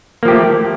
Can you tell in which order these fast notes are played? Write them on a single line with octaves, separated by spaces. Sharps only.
A#3 F3 G4 A3